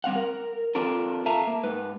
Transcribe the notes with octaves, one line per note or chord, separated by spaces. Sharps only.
G3 C4 F5 F#5
A#4
C4 D4 F4 A4 A#4
A4 E5 F5 A5 A#5
A#3
G#2 B4